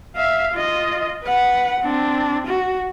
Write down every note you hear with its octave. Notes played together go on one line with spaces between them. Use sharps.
E5 F5
F4 D#5
B4 F#5
C4 D4
F#4